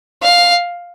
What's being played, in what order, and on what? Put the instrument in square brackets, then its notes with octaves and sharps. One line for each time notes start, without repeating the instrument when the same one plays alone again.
[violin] F5